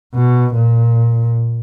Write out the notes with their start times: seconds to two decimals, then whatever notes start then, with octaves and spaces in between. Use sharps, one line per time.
0.15 B2
0.55 A#2